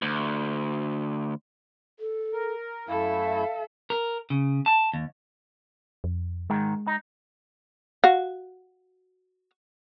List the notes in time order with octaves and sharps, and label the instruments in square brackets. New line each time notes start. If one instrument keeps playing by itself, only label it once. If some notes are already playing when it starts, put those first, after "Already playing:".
[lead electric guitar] D2
[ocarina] A4
[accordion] A#4
[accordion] F#2 A3 E4 [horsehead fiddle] A4 E5 [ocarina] F5
[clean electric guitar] A#4
C#3
A5
D#2
[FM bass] F2
[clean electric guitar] G#2 D#3 [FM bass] G#3
[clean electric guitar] D#4
[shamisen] F#4 F5